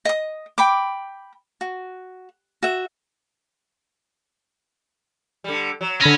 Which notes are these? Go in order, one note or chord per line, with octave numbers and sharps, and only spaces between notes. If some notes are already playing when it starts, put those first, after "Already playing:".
D#5 D#6
G5 B5 D6
F#4
F#4 E5
D3 G3
F#3
D3 C#4 B5 A#6